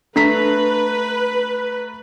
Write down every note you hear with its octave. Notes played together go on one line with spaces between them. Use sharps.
A3 D4 B4 A#5 B6